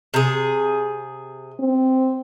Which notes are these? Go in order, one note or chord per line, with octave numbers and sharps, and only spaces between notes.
C3 G#4
C4